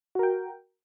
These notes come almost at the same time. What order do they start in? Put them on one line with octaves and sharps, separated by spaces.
F#4 A#4 G5